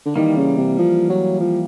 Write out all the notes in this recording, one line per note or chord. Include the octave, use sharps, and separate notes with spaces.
D3
D#3 E3 G3 A#3
C#3
C3
F3
F#3
F3